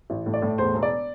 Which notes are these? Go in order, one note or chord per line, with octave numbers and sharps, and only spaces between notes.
A1
A2
D5
A2
E2 C5
E1
D5